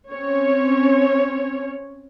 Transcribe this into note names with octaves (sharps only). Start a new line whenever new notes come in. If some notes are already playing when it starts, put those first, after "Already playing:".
C4 C#4 C#5